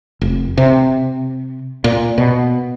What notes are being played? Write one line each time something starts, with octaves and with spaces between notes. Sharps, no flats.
F1
C3
A#2
B2